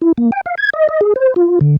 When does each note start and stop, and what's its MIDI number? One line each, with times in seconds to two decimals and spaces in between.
0.01 0.12 64
0.18 0.31 58
0.32 0.41 79
0.46 0.55 77
0.58 0.70 92
0.73 0.88 75
0.89 1.01 75
1.01 1.14 68
1.16 1.34 72
1.36 1.59 65
1.61 1.77 50